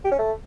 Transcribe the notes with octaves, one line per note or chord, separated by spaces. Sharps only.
G4
C#4
A3